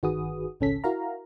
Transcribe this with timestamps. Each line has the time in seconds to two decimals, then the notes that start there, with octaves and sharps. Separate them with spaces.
0.03 G1 D#3 F#4 G#4 B4 D#6
0.60 G#1 C#2 C#3 C#4 A4 B6
0.84 E4 F#4 A#4 F5 A#5